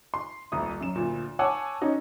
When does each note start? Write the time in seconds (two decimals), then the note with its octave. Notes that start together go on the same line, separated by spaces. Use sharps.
0.14 C6
0.52 D#1 C2 D#6
0.80 F#2 E7
0.95 D2 A#2
1.39 C#5 F#5 G#5 A5 D6 E6
1.81 C#4 D#4 F#4